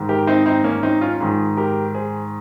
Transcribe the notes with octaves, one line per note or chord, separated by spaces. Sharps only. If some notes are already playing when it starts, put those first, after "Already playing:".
Already playing: G#2 D#3
G4 A#4
C4 D#4
C4 D#4
A#3 C#4
C4 D#4
C#4 F4
G#2 D#3 F4 G#4
G4 A#4
G#4 C5